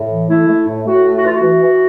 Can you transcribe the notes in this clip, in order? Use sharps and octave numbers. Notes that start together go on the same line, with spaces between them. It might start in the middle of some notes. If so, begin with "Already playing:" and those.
Already playing: A2
E3
A3 E4
A3
A2
A2 F#4
A3
F#4
E3 F4
F#4
E3
E3